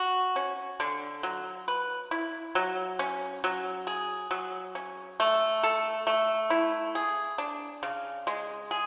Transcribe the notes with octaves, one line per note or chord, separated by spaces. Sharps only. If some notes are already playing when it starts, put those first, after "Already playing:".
Already playing: F#4
C#4
D3
F#3
B4
E4
F#3
C#4
F#3
G#4
F#3
C#4
A3
A4
A3
E4
G#4
D4
C#3
G#3
G#4